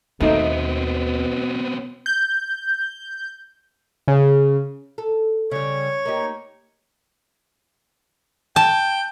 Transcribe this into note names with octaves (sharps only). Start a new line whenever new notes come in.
D#2 B2 A3 B3 C4 D#4
G6
C#3
A4
C#3 G3 C#5
A#3 D#4 G4
G5 A5